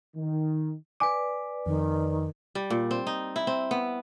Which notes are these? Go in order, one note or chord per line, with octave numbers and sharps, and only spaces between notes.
D#3
B4 D5 G#5 D6
F2 D#3
G3
A#2
C4
D#4
E4
C4
B3